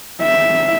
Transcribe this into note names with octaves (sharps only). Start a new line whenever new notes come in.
E5